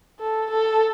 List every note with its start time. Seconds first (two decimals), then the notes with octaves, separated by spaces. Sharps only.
0.20 A4
0.50 A4